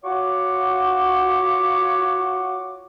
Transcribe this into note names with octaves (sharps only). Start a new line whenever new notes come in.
F4 F#4 C#5 F#5 C#6 D6